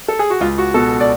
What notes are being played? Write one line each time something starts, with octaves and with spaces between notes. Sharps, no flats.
A4
G#4
F#4
C#2 F4
F#4
B2 A4
D5